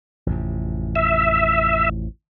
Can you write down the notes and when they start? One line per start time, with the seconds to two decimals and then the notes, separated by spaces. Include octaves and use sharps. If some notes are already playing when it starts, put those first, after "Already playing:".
0.27 A1 F2 C3
0.96 E5